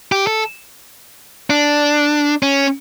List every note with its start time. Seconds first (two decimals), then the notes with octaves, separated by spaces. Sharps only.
0.12 G4
0.27 A4
1.50 D4
2.43 C#4